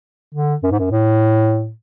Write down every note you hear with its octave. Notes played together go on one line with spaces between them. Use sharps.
D3
F#2
G#2
F#2
A2